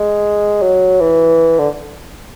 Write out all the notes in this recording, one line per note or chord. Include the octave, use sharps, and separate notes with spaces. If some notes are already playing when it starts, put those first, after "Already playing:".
Already playing: G#3
F#3
E3
D3